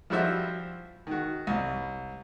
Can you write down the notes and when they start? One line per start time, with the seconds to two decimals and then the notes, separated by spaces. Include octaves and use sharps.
0.10 F3 G3 E4 F#4 C5 E5
1.07 D#3 F#4
1.47 C2